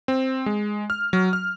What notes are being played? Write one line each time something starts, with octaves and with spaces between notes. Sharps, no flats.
C4
G#3
F6
F#3
F6